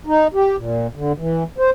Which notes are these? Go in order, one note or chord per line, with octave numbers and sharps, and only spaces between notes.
D#4
G4
A#2
D3
E3
C5